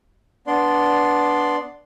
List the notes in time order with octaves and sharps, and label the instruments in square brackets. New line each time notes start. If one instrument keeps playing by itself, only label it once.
[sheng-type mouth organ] B3 D4 D5 C6